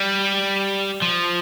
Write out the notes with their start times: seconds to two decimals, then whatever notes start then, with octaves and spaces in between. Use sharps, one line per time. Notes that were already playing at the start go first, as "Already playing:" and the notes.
Already playing: G3
1.02 F3